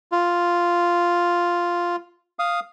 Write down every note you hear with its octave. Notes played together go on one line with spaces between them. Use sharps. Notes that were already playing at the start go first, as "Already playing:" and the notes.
F4
F5 D#6